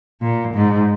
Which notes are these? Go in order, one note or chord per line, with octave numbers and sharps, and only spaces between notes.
A#2
G#2